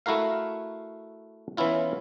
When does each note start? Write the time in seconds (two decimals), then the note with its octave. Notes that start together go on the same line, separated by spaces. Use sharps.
0.06 A3 E4 F#4 A#4 F5
1.57 E3 B3 C#4 E4 F4